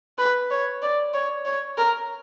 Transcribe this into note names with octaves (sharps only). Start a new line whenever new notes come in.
B4
C#5
D5
C#5
C#5
A#4